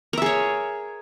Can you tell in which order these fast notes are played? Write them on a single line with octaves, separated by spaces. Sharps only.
A#4 E5 G#4 C#5